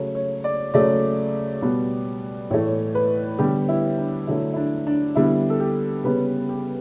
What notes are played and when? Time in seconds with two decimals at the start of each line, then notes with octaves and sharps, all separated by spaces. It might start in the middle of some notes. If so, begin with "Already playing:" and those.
Already playing: C#3 F#3 A3 C#5
0.15 C#5
0.44 D5
0.74 C#3 F#3 A3 D5
1.62 B2 G3 B3
2.51 A2 E3 A3 C#5
2.95 B4
3.39 D3 G3 B3 G4
3.69 E4
3.98 D4
4.27 D3 F#3 A3 E4
4.53 E4
4.56 D4
4.87 D4
5.15 D3 G3 B3 E4
5.50 A4
5.60 G4
6.04 C#3 G3 B3 B4
6.49 G4